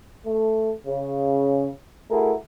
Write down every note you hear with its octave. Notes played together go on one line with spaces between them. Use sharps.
A3
C#3
A3 E4 F#4 G#4 A#4